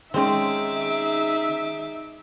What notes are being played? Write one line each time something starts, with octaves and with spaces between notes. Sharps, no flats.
D#3 G#3 C4 C#4 D#4 G#4 E5 D6